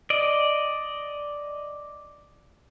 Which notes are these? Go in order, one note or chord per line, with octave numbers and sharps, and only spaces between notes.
D5 D#5